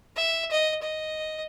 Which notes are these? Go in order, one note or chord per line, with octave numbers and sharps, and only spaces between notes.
E5
D#5
D#5